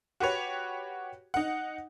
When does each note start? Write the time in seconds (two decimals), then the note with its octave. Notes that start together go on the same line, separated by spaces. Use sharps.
0.20 F#4 G4 B4 C#5
1.34 D#4 F#5